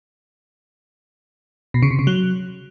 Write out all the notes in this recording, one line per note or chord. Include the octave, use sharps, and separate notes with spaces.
B2
C#3
C3
C#3
F#3